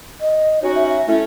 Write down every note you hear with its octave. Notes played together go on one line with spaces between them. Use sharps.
D#5
C#4 D#4 F#4 C#5
E5
E5
A3 C#4 E4